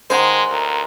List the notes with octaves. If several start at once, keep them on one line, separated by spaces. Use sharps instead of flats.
D#3 G#3 C5 F#5 G#5 C6
D2 A#4